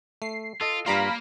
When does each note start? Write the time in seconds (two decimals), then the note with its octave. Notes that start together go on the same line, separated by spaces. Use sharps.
0.22 A3 C7
0.61 F4 A4 D#5
0.86 G2 G3 A#3 F4 F5 A#5 B5